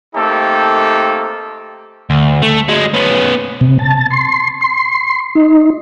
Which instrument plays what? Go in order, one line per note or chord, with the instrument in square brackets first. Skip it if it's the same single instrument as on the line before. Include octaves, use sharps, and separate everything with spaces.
[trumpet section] A3 A#3 C4 D#4 G4 A4
[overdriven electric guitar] D2
A3
F#3 G#3
B3 C#4
[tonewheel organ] C3
A5
C6
C6
D#4